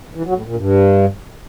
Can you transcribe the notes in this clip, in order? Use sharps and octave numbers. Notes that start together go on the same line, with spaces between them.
E3
F#3
A2
A#2
G2